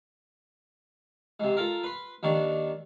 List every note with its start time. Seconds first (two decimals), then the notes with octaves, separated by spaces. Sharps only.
1.40 G#2 C3
1.57 F4 A4 A#4
1.83 B4 C6
2.23 D#2 D#3 D4 C#6